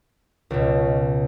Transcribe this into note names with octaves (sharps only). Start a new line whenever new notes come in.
C#2 B2